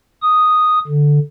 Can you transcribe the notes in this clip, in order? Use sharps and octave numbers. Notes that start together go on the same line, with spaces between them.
D#6
D3